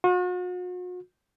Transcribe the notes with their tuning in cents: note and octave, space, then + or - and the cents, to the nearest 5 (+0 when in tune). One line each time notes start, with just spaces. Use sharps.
F#4 -45